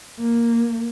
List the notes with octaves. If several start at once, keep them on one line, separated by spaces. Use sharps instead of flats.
A#3